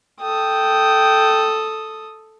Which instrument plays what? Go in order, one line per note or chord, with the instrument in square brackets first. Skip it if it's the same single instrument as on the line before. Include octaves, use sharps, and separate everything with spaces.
[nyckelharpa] A4 D#6 [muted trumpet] G5